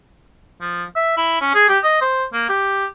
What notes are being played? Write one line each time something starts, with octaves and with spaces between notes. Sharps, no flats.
F3
E5
E4
C#4
G#4
G4
D#5
C5
A#3
G4